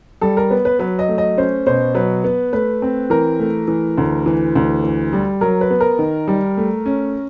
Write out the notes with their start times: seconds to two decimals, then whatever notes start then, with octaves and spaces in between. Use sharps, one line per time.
0.21 G3 A4
0.37 A#4
0.51 B3 B4
0.65 B4
0.79 F#3 B4
0.99 D#5
1.09 A3
1.18 D#5
1.37 C#4 C5
1.67 B2 C5
1.94 F#3 B4
2.24 B3
2.53 A3 B4
2.82 C4
3.10 E3 A#4
3.39 A3
3.68 E3
3.98 D2
4.26 E3
4.55 D2
4.84 E3
5.13 G3
5.41 F#3 A#4
5.61 B4
5.70 B3
5.80 A#4
5.99 D#3
6.28 G3
6.57 A3
6.86 C#4